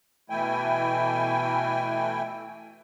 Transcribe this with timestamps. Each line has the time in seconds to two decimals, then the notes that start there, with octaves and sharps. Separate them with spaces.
0.30 B2 E3 A3 E4 G5 G#5